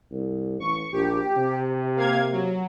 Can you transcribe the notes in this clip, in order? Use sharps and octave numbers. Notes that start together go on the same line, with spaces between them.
C2
A1 C#6
A#1 G4
C3
A#3 F5 G#6
F#3